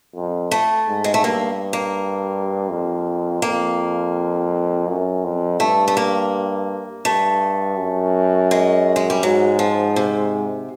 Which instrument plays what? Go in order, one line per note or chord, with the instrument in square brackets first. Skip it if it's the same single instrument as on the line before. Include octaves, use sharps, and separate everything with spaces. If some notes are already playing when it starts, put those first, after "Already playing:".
[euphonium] F2
[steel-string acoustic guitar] A3
[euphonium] G#2
[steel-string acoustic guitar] G#3
A3
[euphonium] G2 [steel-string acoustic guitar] A#3
[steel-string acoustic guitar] A#3
[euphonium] F2
[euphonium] F2 [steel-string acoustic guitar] A#3
[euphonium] F#2
F2
[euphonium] G2 [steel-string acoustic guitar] A3
[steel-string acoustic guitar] A3
A#3
[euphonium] G2 [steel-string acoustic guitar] A3
[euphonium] F#2
[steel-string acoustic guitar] G#3
G#3
G3
[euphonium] G#2 [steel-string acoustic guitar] F#3
[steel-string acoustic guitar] F3
C3